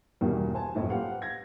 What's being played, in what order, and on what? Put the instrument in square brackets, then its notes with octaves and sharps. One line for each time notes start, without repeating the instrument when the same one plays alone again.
[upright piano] E2 G2 B2 D#3 G3 A#3
C5 G#5 A5
F1 A#1 F#2 A2
G4 B4 C5 F5 F#5
G#6 A#6